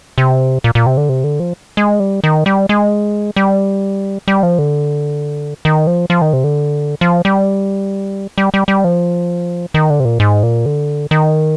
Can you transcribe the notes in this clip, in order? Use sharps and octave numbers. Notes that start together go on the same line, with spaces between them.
C3
A#2
A#2
C3
D3
C3
D3
F3
G#3
G3
D#3
G3
G#3
G3
G3
F3
D3
D#3
F3
F3
D#3
C3
D3
F3
G3
G3
G3
G3
F3
D#3
D3
C3
A#2
G#2
A#2
D3
D#3